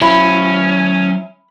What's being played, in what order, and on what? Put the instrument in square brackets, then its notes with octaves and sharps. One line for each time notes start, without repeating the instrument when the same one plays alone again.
[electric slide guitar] F#3 C5 [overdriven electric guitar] C#4 [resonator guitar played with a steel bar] E4 [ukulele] B5